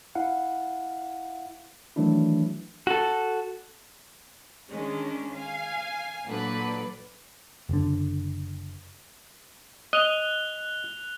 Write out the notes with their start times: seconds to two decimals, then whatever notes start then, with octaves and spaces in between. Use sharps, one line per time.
0.15 E4 F5 F#5
1.96 D#3 E3 F#3 A3 D4 E4
2.87 F#4 A4
4.70 D#3 G#3 C#4 D4
5.32 F5 G#5
6.27 A#2 D3 F#3 B4 D5
7.69 F#1 D3
9.93 D#5 F#6 F7 G7